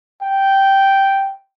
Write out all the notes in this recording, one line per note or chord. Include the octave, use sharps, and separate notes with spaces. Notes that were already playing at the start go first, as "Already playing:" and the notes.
G5